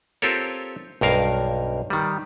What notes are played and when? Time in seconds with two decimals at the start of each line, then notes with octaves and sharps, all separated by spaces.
0.22 C4 F4 G4 A4 A#4 C#5
1.01 B1 G2 A#4 F5
1.90 D#3 G3